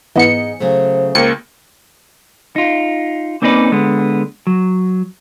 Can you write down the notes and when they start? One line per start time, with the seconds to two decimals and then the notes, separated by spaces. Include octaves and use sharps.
0.16 G#2 E3 B3 D#5 C#7
0.61 C#3 F#3 A3 C5
1.15 C#2 A#3 C#7
2.56 D#4 F4
3.42 A#3 C4 C#4 D#4 B4 D5
3.72 D3 G#3 B3
4.47 F#3